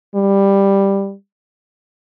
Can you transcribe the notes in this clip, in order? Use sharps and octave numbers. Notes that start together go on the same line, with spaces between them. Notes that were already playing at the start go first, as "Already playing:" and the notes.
G3